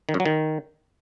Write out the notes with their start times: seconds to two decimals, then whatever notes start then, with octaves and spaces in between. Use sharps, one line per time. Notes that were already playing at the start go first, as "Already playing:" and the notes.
0.09 D#3
0.14 F#2
0.20 F#3
0.26 D#3